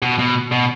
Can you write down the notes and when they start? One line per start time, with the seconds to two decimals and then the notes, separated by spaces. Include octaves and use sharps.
0.02 B2
0.19 B2
0.52 B2